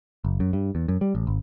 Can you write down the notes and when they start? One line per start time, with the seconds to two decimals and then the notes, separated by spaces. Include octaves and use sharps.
0.24 F#1
0.40 F#2
0.53 G2
0.75 E2
0.88 F#2
1.01 G3
1.15 A1
1.27 G#1